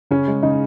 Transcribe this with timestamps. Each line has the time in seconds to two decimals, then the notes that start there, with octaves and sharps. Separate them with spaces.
0.11 C#3 C#4
0.28 G#3
0.43 C#3 D#4